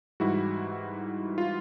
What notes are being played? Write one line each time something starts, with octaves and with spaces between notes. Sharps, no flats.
G#2 E3 G3 E4 F#4
F4